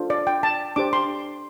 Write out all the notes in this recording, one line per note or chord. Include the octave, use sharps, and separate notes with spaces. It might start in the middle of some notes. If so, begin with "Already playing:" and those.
Already playing: D4 F4 A4 C5
D5
G5
A5
D4 G4 C5 D6
C6